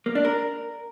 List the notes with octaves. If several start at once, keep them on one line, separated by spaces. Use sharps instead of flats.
A#3
D4
A#4